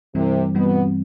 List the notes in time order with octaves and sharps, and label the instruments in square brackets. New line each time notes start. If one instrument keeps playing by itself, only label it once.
[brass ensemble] C2 C3 [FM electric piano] G2 E3 G3 C4
[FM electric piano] G2 E3 G3 C4 [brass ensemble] B2 B3